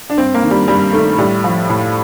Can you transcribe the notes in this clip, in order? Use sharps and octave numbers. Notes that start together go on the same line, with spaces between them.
D4
G2 C4
A#3
D#3
G3
G2 G3
D#3 A3
A2 G3
F3
A2